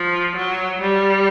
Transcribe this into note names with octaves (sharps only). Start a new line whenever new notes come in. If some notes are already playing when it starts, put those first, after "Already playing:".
Already playing: F3
F#3
G3